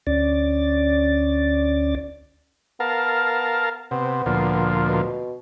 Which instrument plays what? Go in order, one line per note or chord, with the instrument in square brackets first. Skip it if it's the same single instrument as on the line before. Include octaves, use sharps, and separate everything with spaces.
[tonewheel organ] D2 C#4 D5 A6
[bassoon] B3 [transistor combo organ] A#4 F5 A5
[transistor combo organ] C3 [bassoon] B3
[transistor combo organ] D2 A#2 F3
[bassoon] B2